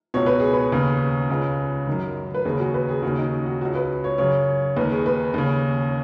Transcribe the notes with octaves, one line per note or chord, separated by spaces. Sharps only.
C#2 B2 C#5
B4
G#4
B4
D#2 C#3
C#2 C#3
F#2 D#3
B4
D#2 C#3 G#4
F#4
B4
G#4
D#2 C#3 F#4
D#4
F#4
C#2 C#3 F#4
B4
C#5
F#2 C#3 C#5
D#2 D#3 B4
G#4
B4
D#2 C#3